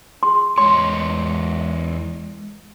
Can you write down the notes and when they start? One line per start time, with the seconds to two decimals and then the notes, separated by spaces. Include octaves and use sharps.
0.23 G#4 C6
0.58 E2 G#3 C#5 C6